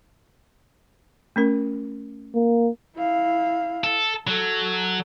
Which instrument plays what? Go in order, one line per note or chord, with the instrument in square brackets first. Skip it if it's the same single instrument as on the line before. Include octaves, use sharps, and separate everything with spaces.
[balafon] A3 C#4 A#4
[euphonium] A#3
[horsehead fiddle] E4 F5
[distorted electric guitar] A4
[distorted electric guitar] F#3 [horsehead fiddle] A4